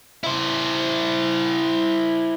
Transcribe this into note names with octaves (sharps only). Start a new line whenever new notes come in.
E4 C5